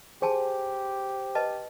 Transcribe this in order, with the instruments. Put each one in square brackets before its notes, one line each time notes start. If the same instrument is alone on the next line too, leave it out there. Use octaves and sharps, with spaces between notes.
[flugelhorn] G4 [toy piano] G#4 G#5 A5 [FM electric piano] C5
[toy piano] B4 D#5 A5